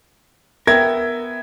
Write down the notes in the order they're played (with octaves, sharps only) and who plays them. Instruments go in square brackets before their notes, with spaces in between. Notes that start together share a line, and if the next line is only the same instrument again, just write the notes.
[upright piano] B3 E5 G5 [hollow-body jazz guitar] A#4 [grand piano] G#6